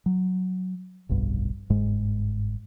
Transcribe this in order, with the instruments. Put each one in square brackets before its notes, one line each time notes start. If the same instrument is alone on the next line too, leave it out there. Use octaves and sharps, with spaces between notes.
[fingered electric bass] F#3
F1 B1 G2
G1 G#2 G#3